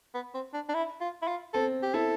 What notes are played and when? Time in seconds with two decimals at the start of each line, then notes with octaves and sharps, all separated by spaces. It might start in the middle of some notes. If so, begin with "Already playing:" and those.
0.14 B3
0.34 C4
0.54 D4
0.69 D4
0.75 E4
1.01 F4
1.22 E4
1.28 F4
1.54 C4 A4
1.83 G4
1.94 E4 A4